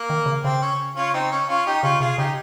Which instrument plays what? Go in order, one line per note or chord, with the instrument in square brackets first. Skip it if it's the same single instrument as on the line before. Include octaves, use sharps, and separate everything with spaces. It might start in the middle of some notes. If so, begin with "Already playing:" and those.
Already playing: [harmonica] A#3
[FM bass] D#3
C#3
[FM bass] C#3 [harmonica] C4
[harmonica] C#4
C#4 F4
C4 D#4
C#4
C#4 F4
D#4 G4
[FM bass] C#3 [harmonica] C#4 F4
[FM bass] C3 [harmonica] F4 G#4
[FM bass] C#3 [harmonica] D#4 G4